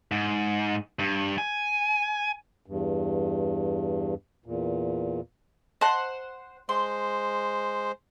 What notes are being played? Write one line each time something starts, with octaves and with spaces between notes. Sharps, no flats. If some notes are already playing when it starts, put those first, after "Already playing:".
G#2
G2
G#5
E2 G2
E2 A#2
C5 D#5 F#5 A5
G#3 C5 C6